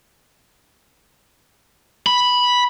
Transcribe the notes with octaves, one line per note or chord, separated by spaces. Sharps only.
B5